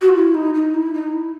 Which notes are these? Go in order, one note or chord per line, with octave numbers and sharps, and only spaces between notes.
F#4
F4
E4
D#4
D#4
E4
D#4
E4